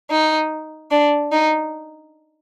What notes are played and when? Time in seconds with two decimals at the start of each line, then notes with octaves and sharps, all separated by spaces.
0.11 D#4
0.91 D4
1.32 D#4